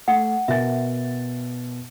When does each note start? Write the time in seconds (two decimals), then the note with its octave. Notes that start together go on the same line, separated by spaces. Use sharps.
0.08 A3 F#5
0.48 B2 A#4 E5 G#5 A6